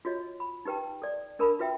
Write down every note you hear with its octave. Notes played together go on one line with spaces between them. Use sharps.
F4 F#4 C#5 D#5
B5
D#4 G4 B4 G5 A5
A4 D5
D4 A4 A#4 A5 B5
F4 F#4 B4 E5 G5